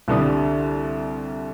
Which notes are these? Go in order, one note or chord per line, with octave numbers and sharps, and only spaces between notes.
C2 D3 G3 D#6